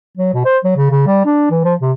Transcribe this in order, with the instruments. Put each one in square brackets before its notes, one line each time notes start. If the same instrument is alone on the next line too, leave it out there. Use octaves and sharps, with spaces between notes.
[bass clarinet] F#3
B2
C5
F#3
C#3
C#3
G3
D4
E3
F3
C3